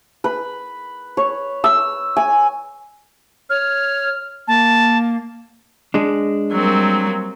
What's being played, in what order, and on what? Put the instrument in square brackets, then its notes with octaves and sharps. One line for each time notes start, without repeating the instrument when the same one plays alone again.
[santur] B4
C#5
E6
G#5
[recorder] C#5 [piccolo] F6
[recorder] A#3 [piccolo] A5
[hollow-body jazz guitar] G#3 D4
[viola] F#3 C4 [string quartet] G3 A#3